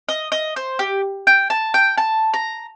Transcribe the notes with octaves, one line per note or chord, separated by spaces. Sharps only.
D#5
D#5
C5
G4
G5
A5
G5
A5
A#5